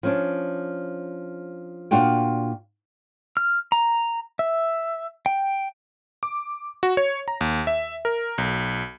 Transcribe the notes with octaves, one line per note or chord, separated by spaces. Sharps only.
F3 C#4 D4
A#2 D4 F4 F#4 G5
F6
A#5
E5
G5
D6
F#4
C#5
A#5
D#2
E5
A#4
B1